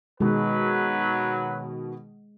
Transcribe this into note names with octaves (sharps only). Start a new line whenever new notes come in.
B2 D#3 F#3 G#3 B4